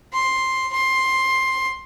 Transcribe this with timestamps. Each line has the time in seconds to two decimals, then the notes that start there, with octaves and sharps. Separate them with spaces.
0.13 C6
0.73 C6